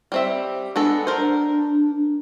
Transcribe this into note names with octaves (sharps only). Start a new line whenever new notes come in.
G3 C4 E5
G#3 B3 D4 A4
A#4 C5